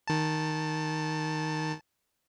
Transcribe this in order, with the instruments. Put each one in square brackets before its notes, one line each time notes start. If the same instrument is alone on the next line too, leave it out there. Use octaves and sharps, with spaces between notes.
[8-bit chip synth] D#3 A5